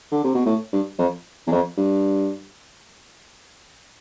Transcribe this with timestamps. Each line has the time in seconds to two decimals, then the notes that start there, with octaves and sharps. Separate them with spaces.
0.11 D3
0.24 C3
0.35 B2
0.46 A2
0.73 G2
0.98 F2
1.47 E2
1.52 F2
1.77 G2